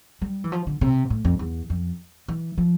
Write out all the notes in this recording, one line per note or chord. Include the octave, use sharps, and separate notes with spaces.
G3
E3
F3
D3
C3
A2
F2
E2
F2
E3
F3